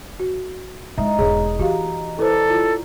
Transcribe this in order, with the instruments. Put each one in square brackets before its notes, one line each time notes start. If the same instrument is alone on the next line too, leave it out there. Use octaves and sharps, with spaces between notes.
[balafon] F#4
[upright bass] G#3 E4 [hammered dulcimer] D#4 [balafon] E5
[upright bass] E1 G#2 [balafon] G#4 C#5
[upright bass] E3 [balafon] F#4 G4 F5
[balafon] E4 B4 C5 [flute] A4 [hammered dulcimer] D5
[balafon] E4 F4